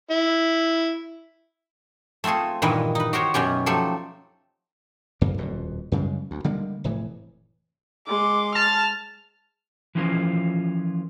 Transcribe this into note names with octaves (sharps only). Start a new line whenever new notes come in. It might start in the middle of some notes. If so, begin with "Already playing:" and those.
E4
A3 C4 F4 G#4 A4
G2 A#2 D#3 E3 B4 D#5
D#4 B4
F#4 G4 A#4 C5 C#5
F#2 B2 C#4 G4
F3 F#3 A3 G4 A4
F#1 F#2 D3 A#3
D#1 F2 B2
F#2 C#3 G3 G#3
D2
D3 G3 G#3 A#3
F1 A2 E3
G#3 C6 D6
A5 F6
E3 F3 C#4 E4 F4 A#4